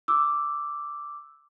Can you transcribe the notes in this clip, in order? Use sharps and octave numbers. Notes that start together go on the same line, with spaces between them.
D6 E6